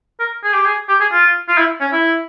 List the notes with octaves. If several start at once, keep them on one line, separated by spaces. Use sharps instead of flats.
A#4
G#4
G4
G#4
G4
G#4
F4
F4
E4
C#4
E4